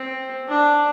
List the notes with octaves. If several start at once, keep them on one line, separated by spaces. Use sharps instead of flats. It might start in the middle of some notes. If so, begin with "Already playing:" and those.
Already playing: C4
D4